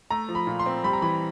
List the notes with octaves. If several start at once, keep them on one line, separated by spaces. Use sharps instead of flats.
A3 A#5
F3
B5
A#2
C6
C4
G3 B5
A#5
E3 B5